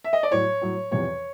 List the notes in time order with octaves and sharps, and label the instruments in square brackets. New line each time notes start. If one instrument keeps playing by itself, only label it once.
[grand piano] E5
D#5
D5
A2 F#3 C#5
A2 F#3
E2 C3 F3 C#5